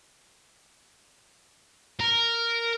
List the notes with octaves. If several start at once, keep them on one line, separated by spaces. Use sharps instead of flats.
A#4